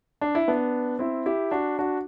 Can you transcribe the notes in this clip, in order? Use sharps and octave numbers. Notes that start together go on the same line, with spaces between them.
D4
E4
B3 D4
C4 E4
E4 G4
D4 F#4
D4 F#4